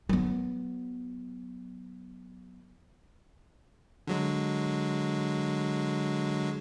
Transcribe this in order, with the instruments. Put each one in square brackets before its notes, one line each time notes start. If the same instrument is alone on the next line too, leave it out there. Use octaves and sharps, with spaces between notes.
[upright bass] F#3 B3
[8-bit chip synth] D3 F#3 G#3